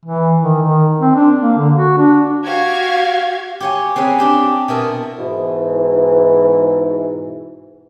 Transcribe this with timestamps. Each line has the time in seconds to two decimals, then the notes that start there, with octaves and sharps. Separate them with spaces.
0.05 E3
0.41 D#3
0.62 D#3
1.00 C4
1.15 D4
1.41 A#3
1.58 D3
1.75 F#4
1.97 D4
2.46 F#4 G4 F5 G#6
3.60 G4 C#5 G#5
3.96 C4 C#4 G#4 B4
4.19 D4 G4 A5
4.68 B2 E4 A#4 D#5 A5
5.19 G#2 B2 E3